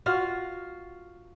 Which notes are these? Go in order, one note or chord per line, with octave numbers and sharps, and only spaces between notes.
F4 F#4 F5